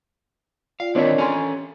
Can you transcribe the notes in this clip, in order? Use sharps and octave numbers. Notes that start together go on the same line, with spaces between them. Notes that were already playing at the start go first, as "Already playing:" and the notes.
F4 D5 F5 G5
D3 D#3 C4 D4 E4 A#4 C#5 D#5
C#4 G4 A4 G#5 C6